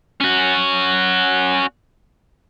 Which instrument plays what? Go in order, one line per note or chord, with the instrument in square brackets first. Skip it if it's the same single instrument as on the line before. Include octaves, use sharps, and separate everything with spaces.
[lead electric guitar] C#4 F#4